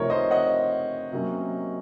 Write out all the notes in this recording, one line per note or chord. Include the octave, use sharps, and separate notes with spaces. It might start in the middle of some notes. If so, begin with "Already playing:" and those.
Already playing: C3 F3 A3 D#4 A#4 C#5
C5 D#5
D#5 F#5
C3 F#3 A#3 C#4